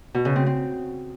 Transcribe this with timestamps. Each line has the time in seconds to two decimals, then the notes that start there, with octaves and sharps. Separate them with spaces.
0.14 B2
0.25 C#3
0.36 C4
0.46 C4